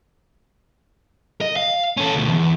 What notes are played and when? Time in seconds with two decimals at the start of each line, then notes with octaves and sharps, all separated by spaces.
1.41 D#5
1.56 F5
1.97 C#4 A4
2.15 D2 B2
2.29 E2